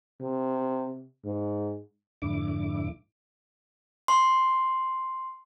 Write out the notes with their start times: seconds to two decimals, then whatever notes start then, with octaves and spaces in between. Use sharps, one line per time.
0.21 C3
1.25 G#2
2.22 F2 G#2 D3 E4 D6
4.08 C6